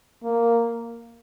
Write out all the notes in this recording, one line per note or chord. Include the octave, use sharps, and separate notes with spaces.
A#3